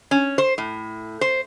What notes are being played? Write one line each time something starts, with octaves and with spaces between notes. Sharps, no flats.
C#4
C5
A2
C5